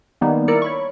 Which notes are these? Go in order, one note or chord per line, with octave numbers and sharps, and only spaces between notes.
D#3 G3 A#3 B3 D#4
E4 A#4 D5 A#5 E6 C#7
C#5 B5 C#6